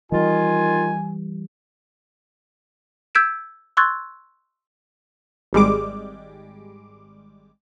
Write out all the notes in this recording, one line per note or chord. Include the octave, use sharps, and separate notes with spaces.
D#3 E3 G3 F4 G#5
E6 G6 G#6 B6 D7 E7
C6 C#6 E6 F#6 G#6 A6
G#1 G3 G#3 D6